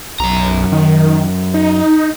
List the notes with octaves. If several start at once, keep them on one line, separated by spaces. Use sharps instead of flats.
B1 F#2 A#5
D#3
D#4